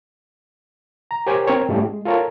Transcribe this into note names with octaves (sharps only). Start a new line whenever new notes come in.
A#5
G4 A#4 C5 C#5 G5 G#5
C4 A#4 C#5
G#2 G3 A3 C#4 E4 G4
G#3
F4 A4 A#4 C#5